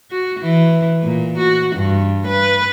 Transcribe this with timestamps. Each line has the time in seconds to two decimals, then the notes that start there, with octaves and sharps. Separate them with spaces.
0.11 F#4
0.40 E3
1.03 A#2
1.38 F#4
1.76 G2
2.28 B4